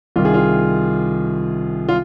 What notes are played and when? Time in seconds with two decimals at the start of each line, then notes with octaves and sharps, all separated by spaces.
0.16 C2 C3 D#3 F4
0.25 G#4
0.34 F4
1.88 F4